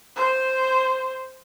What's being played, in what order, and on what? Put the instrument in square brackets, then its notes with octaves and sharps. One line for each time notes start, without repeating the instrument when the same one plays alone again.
[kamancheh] C5